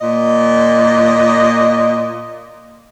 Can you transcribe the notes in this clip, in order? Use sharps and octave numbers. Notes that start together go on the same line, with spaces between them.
A#2 D#5